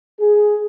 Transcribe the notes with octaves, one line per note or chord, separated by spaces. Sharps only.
G#4